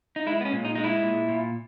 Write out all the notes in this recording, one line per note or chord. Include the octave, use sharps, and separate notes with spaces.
D#4
G#3 E4
B3
C#4
A#2
D#4
G#3 D#4
E4
A#2
A#2